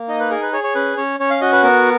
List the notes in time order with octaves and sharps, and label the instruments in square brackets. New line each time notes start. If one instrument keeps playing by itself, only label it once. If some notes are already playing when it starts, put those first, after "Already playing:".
Already playing: [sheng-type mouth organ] A#3
D#4 D#5
B4
G#4 A#4
B4
G#4 C#5
C#5
C#4 B4
C#4 C#5
C#4 C#5
F5
F#4 D#5
B4
B3 A#4